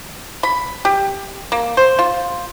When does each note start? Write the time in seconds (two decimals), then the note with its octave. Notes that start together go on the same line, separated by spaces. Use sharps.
0.43 B5
0.85 G4
1.52 A#3
1.77 C5
1.99 F4